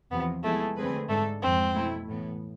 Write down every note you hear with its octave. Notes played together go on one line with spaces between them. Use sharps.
E2 C3 F3 B3
F3 G#3 A3 B3 E4 G#4
D3 A3 C4 G#4 B4
G#2 G#3 A3 D4 A4
F2 E3 G#3 C4
B2 A3 E4
A2 E3 B3